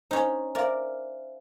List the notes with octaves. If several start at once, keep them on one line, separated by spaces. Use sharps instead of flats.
C#4 D#4 C5
A#4 C5 D5 E5 F5